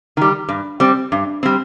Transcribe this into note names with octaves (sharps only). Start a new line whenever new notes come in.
D#3 G3
G2
G3 C4
G2
G3 C4